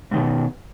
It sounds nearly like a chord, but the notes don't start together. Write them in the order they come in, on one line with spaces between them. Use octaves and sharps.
G#2 D#3 B2